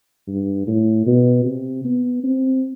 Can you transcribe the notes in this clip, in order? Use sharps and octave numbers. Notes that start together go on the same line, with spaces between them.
G2
A2
B2
C3
B3
C4